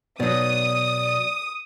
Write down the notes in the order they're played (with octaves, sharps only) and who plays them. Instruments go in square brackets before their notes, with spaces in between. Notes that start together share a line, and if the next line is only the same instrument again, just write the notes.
[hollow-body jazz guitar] B2 F#3 [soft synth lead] D5 [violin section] D#6